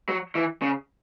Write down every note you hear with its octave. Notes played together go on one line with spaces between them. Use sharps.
F#3
E3
C#3